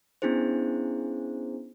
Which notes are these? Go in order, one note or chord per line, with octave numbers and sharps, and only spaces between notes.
B3 C#4 D4 E4 G#4 C5